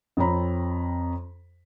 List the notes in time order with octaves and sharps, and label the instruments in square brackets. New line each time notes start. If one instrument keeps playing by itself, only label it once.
[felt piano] F2 F3 C4 C#5 A#5 B5